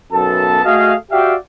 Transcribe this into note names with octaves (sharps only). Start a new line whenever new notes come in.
B1 F#2 B3 A4 A5
A3 F#4 G#4 D#5 F5
F#4 G4 D5 E5 F5 G5